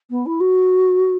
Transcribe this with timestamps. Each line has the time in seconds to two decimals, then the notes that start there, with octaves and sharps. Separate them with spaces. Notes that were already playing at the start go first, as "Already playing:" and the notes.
0.10 B3
0.26 E4
0.40 F#4